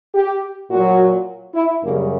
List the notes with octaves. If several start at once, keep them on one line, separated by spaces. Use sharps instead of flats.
G4
A#2 F#3 F#4
E4
F#2 C#3 G3 A#3